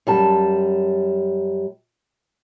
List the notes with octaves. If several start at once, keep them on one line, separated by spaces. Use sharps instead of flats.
F#2 G3 A5